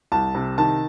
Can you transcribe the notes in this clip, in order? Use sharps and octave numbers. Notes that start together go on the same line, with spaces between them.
C2 A5
C3
D#3 A5